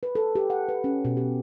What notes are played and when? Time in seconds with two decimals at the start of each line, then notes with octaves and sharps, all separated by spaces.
0.03 B4
0.15 A4
0.35 G4
0.50 F#5
0.69 B4
0.84 C#4
1.05 B2
1.17 G4